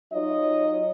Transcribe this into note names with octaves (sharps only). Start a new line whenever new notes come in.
F#3 D#4 F4 C#5 D#5